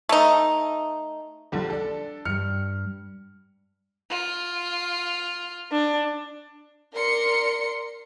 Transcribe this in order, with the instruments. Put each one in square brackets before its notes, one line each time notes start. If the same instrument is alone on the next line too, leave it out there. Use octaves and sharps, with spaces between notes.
[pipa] A3 D#4
[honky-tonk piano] A#1 D3 G3
D4 A4
[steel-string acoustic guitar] G2 G3 [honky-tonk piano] F6 C#7
[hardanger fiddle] F4
[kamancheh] D4
[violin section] A#4 D5 C6 C#7